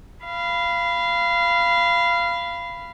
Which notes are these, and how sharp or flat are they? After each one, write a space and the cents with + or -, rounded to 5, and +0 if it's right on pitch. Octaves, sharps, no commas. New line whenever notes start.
F5 -20 B5 +0